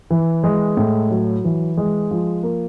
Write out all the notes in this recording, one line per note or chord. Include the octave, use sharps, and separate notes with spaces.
E3
G#3
A2
F#3
E3
G#3
F3
A#3